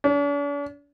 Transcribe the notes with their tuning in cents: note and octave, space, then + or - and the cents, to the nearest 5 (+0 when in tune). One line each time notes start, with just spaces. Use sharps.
D4 -45